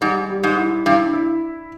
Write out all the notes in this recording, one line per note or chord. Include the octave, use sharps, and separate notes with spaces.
G#2 G3
G3
G#2
E4
G2 E4
E4